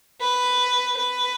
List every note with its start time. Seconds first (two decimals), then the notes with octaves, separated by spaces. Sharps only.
0.20 B4
0.97 B4